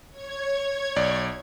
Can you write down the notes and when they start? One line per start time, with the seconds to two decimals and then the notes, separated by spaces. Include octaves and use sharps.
0.10 C#5 G#6
0.96 B1 D5